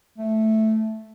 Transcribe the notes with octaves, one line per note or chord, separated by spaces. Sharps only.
A3